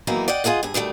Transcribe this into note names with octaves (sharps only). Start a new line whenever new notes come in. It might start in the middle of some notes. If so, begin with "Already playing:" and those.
E2 D#3 E3 F#3 A#3 D#4
D5 D#5 F#5 G5
F4 G#4 A4 D#5 F#5
G2 G#4
D2 D#3 G3 A3